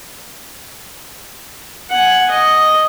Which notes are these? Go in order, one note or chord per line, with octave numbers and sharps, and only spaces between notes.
F#5 G#5
D#5